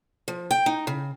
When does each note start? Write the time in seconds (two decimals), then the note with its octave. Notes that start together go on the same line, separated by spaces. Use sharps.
0.28 F3
0.51 G5
0.66 D#4
0.87 C#3